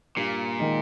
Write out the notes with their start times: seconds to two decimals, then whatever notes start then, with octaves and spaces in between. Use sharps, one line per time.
0.16 G2 A#2
0.59 D#3 G#3 D#4